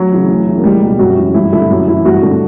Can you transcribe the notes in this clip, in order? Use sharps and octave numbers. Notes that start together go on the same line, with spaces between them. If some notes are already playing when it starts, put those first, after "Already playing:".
Already playing: F#3
C#3 E3
D2
C#3 E3
A#3
C#2 G3
B2 G3
F#2 F#4
C#3 E3
G2 E4
D3 E4
F#2
E3 E4
G2 F#4
D3